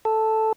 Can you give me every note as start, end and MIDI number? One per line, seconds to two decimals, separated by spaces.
0.05 0.53 69